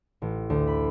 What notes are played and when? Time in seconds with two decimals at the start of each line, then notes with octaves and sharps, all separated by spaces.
0.22 A1
0.50 D2
0.67 B5